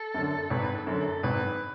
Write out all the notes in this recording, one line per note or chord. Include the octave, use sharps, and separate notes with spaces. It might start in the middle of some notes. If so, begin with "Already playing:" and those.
Already playing: A4
F#2 D3
G#1 B4
A4
F#2 D3
A4
G#1 B4